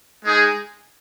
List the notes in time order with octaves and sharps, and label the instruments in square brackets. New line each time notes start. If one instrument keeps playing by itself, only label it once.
[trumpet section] G#3 D#4 G#4